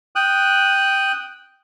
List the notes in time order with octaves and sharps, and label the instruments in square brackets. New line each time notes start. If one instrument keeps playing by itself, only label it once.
[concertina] G5 D#6 F#6